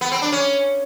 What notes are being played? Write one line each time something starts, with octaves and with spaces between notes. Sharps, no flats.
B3
C4
D4
C#4